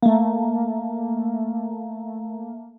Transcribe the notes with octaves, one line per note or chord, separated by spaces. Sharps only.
A3 A#3